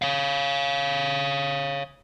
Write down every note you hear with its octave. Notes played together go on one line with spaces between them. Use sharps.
C#5 F5